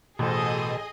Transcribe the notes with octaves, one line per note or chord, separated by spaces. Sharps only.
A1 B2 G#4 A4 C5 D#5